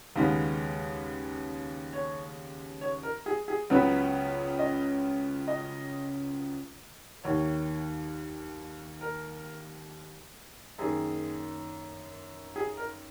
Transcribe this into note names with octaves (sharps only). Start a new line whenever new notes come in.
D#2 C#3 G#3 B3 F5
C#5
C#5
A#4
G#4
G#4
C#2 C#3 F#3 B3 B4
D#5
D#5
D#2 D#3 A#3 C#5
A#4
F#2 D#3 A#3 G#4
G#4
A#4